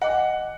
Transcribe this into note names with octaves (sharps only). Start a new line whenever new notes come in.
D#5 F#5 G#5 D6 F#6